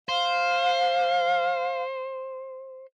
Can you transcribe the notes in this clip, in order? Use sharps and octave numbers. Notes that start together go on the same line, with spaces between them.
C5 F5